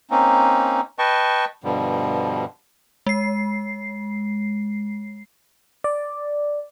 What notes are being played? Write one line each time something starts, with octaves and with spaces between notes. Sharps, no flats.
A#3 C4 C#4 D#4
B4 D#5 G5 A5 C#6
G2 B2 D3 F3 G3
G#3 C7
D5